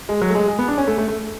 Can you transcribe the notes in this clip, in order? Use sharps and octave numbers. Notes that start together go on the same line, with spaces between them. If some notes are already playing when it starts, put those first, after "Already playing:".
G#3
F#3
A3
G#3
G#3
B3
D4
C#4
A3
A3
A3